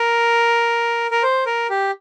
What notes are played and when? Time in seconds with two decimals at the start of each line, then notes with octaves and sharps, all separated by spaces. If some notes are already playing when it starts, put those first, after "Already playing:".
Already playing: A#4
1.11 A#4
1.23 C5
1.46 A#4
1.70 G4